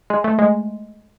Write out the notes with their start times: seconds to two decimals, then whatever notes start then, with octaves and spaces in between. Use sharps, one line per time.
0.10 G#3
0.24 A3
0.39 G#3